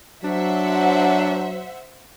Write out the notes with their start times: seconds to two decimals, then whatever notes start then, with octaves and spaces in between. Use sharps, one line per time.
0.24 F#3 D4 C5 E5 F#5